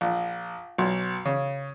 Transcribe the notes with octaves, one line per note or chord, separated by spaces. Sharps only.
A#1
B1
C#3